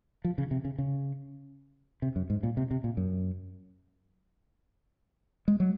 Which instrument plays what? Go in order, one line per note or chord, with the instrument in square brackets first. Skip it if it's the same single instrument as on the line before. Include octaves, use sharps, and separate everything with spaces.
[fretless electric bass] F3
C#3
C3
C#3
C#3
C3
F#2
G#2
A#2
C3
C3
A#2
F#2
G#3
F#3